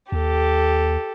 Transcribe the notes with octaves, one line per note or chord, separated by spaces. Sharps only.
D#2 G4 A4